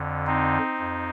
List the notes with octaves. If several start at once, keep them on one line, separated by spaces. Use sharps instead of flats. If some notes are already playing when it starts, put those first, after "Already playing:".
Already playing: F2 D3
C4 D#4
F2